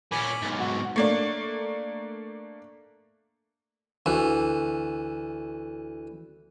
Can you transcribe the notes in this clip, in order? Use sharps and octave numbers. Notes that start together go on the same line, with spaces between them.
A#2 C#4 G#5 B5 D6
B1 G#2
F#4
A3 A#3 D4
D2 E3